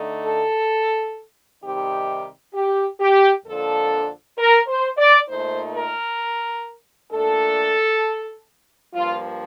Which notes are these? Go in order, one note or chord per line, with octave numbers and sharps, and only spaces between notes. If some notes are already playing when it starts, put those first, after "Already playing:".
Already playing: D3 A3 D#4
A4
C3 D#3 G3 C4 D#4 G4
G4
G4
F2 D3 F3 A#3 D4 A4
A#4
C5
D5
A#2 A3 D#4 C5
A#4
A#2 A3 D4 A4
G2 F3 A#3 F4